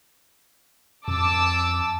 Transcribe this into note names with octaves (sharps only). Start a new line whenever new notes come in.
F2 A5 D6 E6